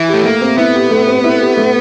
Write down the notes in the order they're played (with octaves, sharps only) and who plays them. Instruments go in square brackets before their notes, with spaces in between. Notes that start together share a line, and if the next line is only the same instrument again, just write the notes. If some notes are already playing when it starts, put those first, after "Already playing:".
Already playing: [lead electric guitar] E3 [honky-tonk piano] E4
[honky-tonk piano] G4
[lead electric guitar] A3
[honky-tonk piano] A3 [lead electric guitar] A#3
[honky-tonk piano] C4
[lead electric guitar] B3 [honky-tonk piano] E4
[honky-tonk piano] G4
A3
C4
E4
G4
A3